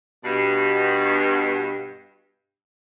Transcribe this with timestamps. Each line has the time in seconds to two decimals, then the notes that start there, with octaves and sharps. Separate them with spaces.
0.24 G2 B2